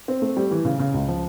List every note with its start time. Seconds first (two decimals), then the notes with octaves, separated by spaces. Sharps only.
0.08 C4
0.22 A3
0.37 G3
0.51 E3
0.65 C#3
0.79 C#3
0.94 C#2
1.09 F3